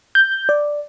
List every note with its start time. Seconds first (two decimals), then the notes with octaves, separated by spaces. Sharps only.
0.15 G6
0.49 D5